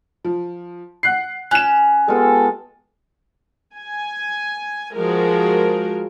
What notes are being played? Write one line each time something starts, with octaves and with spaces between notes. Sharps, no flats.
F3
F#5 F#6 C7
C#4 F#6 E7
G#3 B3 F4 G4 A4
G#5
F3 G#3 F#4 A#4